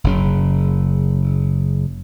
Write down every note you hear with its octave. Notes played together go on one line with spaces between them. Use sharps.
F#1 C#3